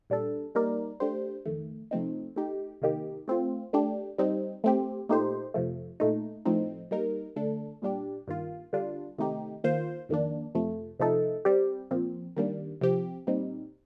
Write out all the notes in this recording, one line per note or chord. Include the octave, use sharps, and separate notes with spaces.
A#2 G3 D4 A4
G3 A#3 D#4 A#4 D5
A3 D4 G4 C5
F2 D#3 A3
C3 F3 A3 C4 D#4
A3 D#4 G4
C3 D#3 A#3 D#4 G4
A3 C4 F4
A3 D4 G4
G3 C4 D#4
A3 C4 G4
A#2 A3 D#4 G4 C5
F2 C3 F3 A3
A#2 A3 D#4
A2 F3 A3 C4 D#4
G3 A#3 D#4 A#4
D3 A3 D4 A4
A#2 G3 D4 G4
G2 D#3 A#3 F4
D3 G3 D4 F4
C3 D#3 A3 D#4 G4
D#3 A#3 F4 C5
F2 D#3 A#3 D4
F2 C3 F3 A3
C3 F3 A3 D#4 A4
G3 C4 G4
A#2 F3 C4
D#3 G3 A#3 D4
C3 F3 C4 G4
A#2 G3 C4 D#4